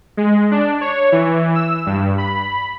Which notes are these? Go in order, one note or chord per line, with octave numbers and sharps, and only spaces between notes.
G#3
D4
C#5
E3
E6
G2
B5